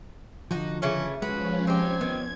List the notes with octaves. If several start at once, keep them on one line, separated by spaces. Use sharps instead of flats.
D3 F3 D#4 F#4
C#3 E3 A3 C#4
F3 G#3 C#4 F#4 B4
C4 D#4 G4 G#6
D#3 B3